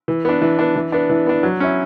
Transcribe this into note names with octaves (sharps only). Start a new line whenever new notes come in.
E3
B3 D4
E3
B3 D4
E3
B3 D4
E3
B3 D4
F#3
C#4 E4